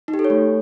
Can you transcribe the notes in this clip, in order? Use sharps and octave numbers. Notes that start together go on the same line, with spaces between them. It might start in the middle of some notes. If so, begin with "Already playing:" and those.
D#4
G4
A4
C#5
A3